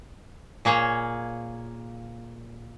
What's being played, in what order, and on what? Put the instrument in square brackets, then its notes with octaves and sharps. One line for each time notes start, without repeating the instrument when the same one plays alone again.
[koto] A#2 A#3 G#4 C#5